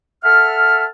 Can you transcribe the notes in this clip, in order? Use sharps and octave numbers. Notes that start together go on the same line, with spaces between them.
A4 E5 F#5 A5 F6